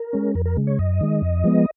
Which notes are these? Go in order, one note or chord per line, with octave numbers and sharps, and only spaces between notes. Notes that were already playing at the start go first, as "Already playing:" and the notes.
Already playing: A#4
G#3 C#4
F2 A#4
A#4
C#3 G#3
C#5
F#2 D#5
D#3 G#3
F2
F3 G#3 B3